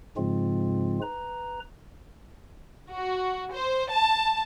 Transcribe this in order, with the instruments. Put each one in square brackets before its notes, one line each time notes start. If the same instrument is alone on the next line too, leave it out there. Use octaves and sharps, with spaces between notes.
[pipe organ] G#2 C#3 F3 G#3 C4 F4
B4 A#5
[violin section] F#4
C5
A5